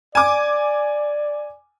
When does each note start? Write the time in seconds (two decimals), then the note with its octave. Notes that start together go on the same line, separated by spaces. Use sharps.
0.15 D5 G#5 D6